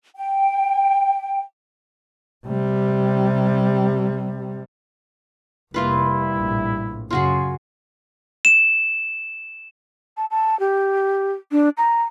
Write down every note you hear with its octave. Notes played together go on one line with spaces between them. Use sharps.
G5
C3 G3
F1 G3 A#3 E4 F4 B4
A#1 A2
F#2 C#3 F4 F#4 G#4
E7
A5
A5
G4
D4
A#5